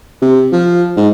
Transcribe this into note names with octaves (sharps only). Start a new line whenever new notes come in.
C3
F3
G#2